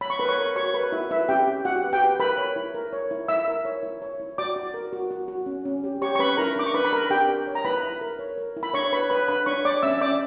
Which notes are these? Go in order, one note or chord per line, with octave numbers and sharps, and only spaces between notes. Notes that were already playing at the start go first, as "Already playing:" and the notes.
C#5 B5
C#6
A#4 B4 B5
C#5 C#6
A#4
F#4 C#5 C#6
A#4 B4 B5
E4 F#4 E5
E4 B4 E5
C#4 G4 G5
G4
F#4 G4 F#5
B4
G4 G5
B4
A#4 B4 B5
C#5
E4
A#4
C#5
E4
E4 E5 E6
A#4
C#5
E4
C#5
E4
F#4 D5 D6
F#4
A#4
F#4
F#4
F#4
C#4
C#4
G4
G4 C#5 C#6
C#6
C#4 B4 B5
E4 A#4 A#5
D4 D6
C#6
D4 B4 B5
B5
A#4 A#5
D4 G4 G5
A#4
C#5
A#5
E4 B4 B5
E4
A#4
C#5
A#4
E4
B5
D4 C#5 C#6
B4 C#5 B5
B4 C#5 B5
D4 B4 B5
D4 C#5 C#6
C#5 D5 D6
C#4 E5 E6
C#4 D5 D6